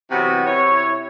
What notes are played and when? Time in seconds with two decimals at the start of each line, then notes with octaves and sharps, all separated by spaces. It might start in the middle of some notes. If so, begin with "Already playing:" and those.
0.11 C3 E3 F#3 B3 F#4
0.46 C3 E4 C#5